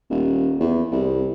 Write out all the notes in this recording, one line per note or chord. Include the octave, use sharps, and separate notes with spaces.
D#1
E2
C2